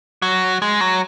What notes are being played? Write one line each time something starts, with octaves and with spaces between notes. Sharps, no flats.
F#3
G#3
F#3